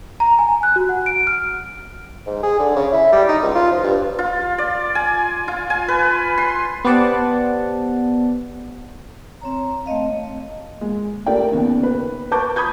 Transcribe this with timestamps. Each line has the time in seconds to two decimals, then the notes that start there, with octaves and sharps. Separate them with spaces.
0.20 A#5
0.39 G#5
0.63 F#6
0.76 F#4
0.89 F#5
1.06 D7
1.27 F6
2.26 G#2
2.43 G#4
2.59 D3
2.76 C#3
2.92 E4
3.12 G3
3.28 D#4
3.42 C#2
3.55 F4
3.71 F3
3.83 G2
4.19 F4
4.58 D5
4.95 G#5
5.48 F4
5.70 G#5
5.88 B4
6.38 C6
6.85 B3 G4 C5 D5 F#5 A5
9.41 C4 C#5 A#5
9.86 A3 C4 D#5 F5
10.81 G#3
11.26 A3 G4 A#4 D5 G5
11.51 D#2 C#3 B3
11.83 B4
12.31 B4 A5 C#6 D6 G6
12.56 B5 D#6 G6 G#6